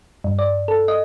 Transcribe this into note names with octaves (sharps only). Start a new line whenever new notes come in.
G2
D5
A4
D#5